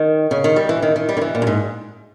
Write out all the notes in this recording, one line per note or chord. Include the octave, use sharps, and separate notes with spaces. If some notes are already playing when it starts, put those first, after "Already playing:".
Already playing: D#3
C#3
D#3
G3
E3
D#3
D#3
G3
D#3
E3
A#2
G2
G#2